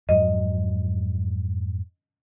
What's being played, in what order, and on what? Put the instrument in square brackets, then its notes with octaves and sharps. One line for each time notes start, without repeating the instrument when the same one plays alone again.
[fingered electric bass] F2 G#2 F#3 [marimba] D#5